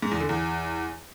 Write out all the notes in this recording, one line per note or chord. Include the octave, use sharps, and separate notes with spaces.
G#2
E2
D3
E2